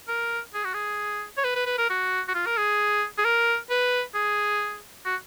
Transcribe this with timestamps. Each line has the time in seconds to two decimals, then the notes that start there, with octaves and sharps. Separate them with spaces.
0.08 A#4
0.54 G#4
0.64 F#4
0.74 G#4
1.38 C#5
1.44 B4
1.55 B4
1.66 B4
1.78 A#4
1.90 F#4
2.28 F#4
2.34 F4
2.46 A#4
2.57 G#4
3.18 G#4
3.25 A#4
3.70 B4
4.15 G#4
5.05 F#4